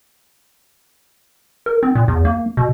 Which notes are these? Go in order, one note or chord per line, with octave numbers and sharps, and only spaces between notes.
A#4
C4
A#2
E2
A#3
B2